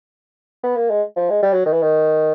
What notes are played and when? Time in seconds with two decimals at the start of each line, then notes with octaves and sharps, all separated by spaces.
0.63 B3
0.76 A#3
0.90 G#3
1.16 F3
1.30 G#3
1.43 G3
1.53 F#3
1.66 D#3
1.72 E3
1.82 D#3